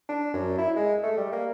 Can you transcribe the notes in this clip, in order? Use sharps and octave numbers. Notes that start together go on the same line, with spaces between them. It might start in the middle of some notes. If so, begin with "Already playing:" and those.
D4
F#2
E4
G#3
A3
G3
A#3